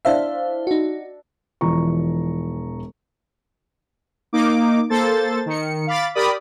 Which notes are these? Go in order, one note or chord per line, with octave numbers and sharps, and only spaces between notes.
D4 E4 C5 E5 F5
D#4 F#4
E1 E3 F3 A#5 C#6
A#3 D#4 D6
A#3 A4 C5 A6
D#3 C#7
F5 B5 D6 A6
G4 A#4 D5 B5 D#6